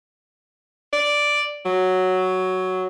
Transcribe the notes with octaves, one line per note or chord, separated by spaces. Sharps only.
D5
F#3